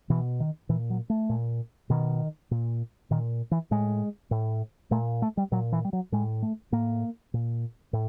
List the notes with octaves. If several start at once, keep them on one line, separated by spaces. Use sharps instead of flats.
B2 E3
D#3
A#2 E3
F#3
A3
A#2
B2 D#3
A#2
A#2 D#3
E3
A2 G#3
A2
A#2 A3
A3
G3
A#2 F#3
E3
G3
F#3
A2 G#3
A3
A2 A#3
A#2
A2